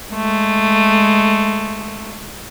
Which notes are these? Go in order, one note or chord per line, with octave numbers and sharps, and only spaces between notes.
G#3 A3